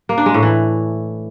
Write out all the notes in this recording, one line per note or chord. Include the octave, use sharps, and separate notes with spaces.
A#3
D4
G#3
A2
E3